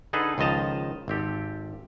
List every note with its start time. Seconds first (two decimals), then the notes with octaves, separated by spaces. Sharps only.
0.13 D3 D#4 G#4 A4 B4
0.38 C#2 D#3 F3 D#5 A5 A#5
1.08 G#1 C4 G4 A4